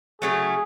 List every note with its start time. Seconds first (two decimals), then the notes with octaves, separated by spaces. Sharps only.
0.22 C#3 F#3 A3 G#4